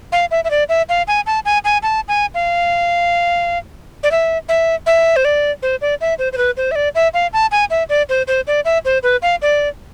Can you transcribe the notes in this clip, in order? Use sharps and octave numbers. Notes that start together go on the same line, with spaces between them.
F5
E5
E5
D5
E5
F5
G#5
A5
G#5
G#5
A5
G#5
F5
D5
E5
E5
E5
C5
D5
C5
D5
E5
C5
C5
B4
C5
E5
D5
E5
F5
A5
G#5
E5
D5
C5
C5
D5
E5
C5
B4
F5
D5